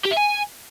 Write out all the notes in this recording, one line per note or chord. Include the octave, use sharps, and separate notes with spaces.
G4
E5
G#5